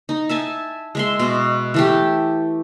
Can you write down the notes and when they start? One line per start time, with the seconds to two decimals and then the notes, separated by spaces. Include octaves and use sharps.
0.09 D#4
0.29 E5 G#5 A5
0.95 G#3 E5 C6
1.19 B2
1.74 E3 A3 G4